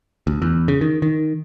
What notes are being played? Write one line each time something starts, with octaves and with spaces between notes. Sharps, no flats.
D2
E2
C#3
D#3
D#3